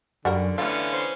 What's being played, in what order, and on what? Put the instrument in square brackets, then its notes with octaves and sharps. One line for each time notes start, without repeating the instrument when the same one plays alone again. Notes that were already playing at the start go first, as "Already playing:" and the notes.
[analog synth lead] F#2 [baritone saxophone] D3 [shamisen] G3 F#4 A#4
[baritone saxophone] D3 [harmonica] E3 B3 C#4 [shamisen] A3 F4 [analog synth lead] F5
[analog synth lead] C5